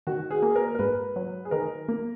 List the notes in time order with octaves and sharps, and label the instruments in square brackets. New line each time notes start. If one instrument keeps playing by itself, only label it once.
[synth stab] D#3 [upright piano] F#4
[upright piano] G#4
[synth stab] A#3
[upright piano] A#4
A#4
[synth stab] G#2 [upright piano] B4
[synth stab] F#3
[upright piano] G#4
[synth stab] D#3 [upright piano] A#4
[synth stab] A#3